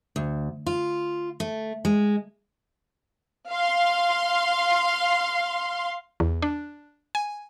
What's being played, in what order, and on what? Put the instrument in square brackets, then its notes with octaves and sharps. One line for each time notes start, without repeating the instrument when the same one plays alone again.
[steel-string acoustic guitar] D2
F4
A3
G#3
[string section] F5 C6
[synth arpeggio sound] E2
D4
G#5